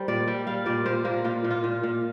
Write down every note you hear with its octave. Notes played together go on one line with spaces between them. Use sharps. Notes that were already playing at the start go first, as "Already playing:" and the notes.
Already playing: G3 A#4 C5
A#2 D5
G3
G3 F5
A#2 D5
A#2 C5
A#2 A#3
A#2 F4
A#2
F4
A#2
A#2